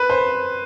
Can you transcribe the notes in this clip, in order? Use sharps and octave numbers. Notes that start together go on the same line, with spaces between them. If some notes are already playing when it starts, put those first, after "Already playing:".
Already playing: B4
C5